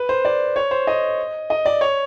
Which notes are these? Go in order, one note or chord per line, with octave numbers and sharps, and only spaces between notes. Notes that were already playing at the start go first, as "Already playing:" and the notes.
Already playing: B4
C5
D5
C#5
C5
D#5
D#5
D5
C#5